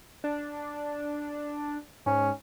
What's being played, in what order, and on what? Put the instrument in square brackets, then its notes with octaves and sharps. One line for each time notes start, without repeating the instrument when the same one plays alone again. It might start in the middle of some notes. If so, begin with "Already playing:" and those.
[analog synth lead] D4
[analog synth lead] G#2 [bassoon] C#4